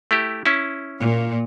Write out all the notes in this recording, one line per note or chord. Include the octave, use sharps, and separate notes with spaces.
A3 E4 G4
C#4 E4
A#2